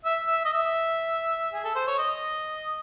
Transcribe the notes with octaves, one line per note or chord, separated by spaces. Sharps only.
E5
E5
D#5
E5
G#4
A4
C5
C#5
D#5